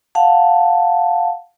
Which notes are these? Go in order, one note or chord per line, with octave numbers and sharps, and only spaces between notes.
F5 F#5 A5